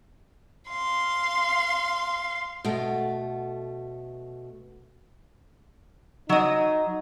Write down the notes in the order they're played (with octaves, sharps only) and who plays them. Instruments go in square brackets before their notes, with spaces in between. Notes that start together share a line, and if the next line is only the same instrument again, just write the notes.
[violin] F5 C6
[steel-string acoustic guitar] B2 A3
[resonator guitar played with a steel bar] F#3 D#5 [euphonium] D#4